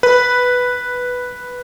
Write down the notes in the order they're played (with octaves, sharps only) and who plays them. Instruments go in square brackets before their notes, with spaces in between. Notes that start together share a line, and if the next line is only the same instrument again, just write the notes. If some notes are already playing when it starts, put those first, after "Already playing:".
[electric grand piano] B4